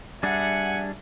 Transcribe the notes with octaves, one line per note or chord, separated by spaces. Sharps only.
G3 D4 G#4 E5 F#5 G#5